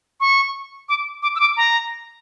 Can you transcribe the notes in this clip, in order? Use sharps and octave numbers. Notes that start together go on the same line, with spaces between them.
C#6
D6
D6
E6
D6
A#5